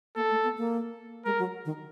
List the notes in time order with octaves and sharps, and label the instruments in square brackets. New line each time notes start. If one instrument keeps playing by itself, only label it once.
[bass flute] A#3 [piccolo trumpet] A4
[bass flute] A3
B3
A#3
[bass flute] G#3 [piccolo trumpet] A#4
[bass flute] F#3
D#3